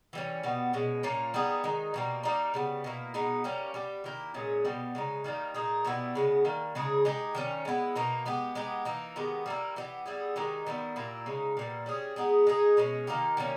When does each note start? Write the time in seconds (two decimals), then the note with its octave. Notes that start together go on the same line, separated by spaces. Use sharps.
0.13 E3 G3 C#4
0.43 B2 G3 B3
0.73 B2 G#3 C#4
1.03 A#2 A#3 C#4
1.34 G3 B3 D#4 G#4
1.64 D#3 G#3 D#4
1.94 B2 G3 A#3
2.23 G3 A#3 D#4
2.54 C#3 G3 B3
2.84 B2 A#3 E4
3.14 B2 G#3 B3 D#4
3.44 G3 A#3 C#4 G4
3.74 G3 B3 G4
4.04 D#3 A#3 E4 G4
4.34 A#2 G#3 C#4 G#4
4.65 B2 G3 B3
4.95 C#3 G#3 D#4
5.24 D#3 G3 A#3 D#4
5.54 A#2 A#3 D#4 G#4
5.85 B2 G3 B3 E4
6.15 C#3 G#3 B3
6.45 D#3 G3 A#3
6.75 C#3 G#3 D#4 G#4
7.05 G#3 D#4 G4
7.35 D#3 G3 C#4
7.65 G#3 B3 E4
7.95 B2 A#3 D#4
8.26 G#3 B3 G4
8.55 G#3 B3 D#4 G4
8.85 E3 A#3 D#4
9.16 D#3 G#3 B3 G4
9.46 G3 A#3 E4
9.76 E3 G3 B3 G4
10.06 G3 B3 E4 G#4
10.36 D#3 G#3 D#4 G4
10.67 D#3 G3 B3 E4
10.96 A#2 A#3 E4 G4
11.26 C#3 G#3 D#4
11.57 A#2 G3 B3
11.86 G3 C#4 G#4
12.16 G#3 B3 D#4 G#4
12.47 G#3 D#4 G#4
12.77 B2 G#3 C#4
13.07 D#3 A#3 D#4 G4
13.37 D#3 G3 A#3 C#4